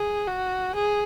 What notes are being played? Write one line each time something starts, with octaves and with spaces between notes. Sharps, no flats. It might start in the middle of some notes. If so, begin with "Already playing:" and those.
Already playing: G#4
F#4
G#4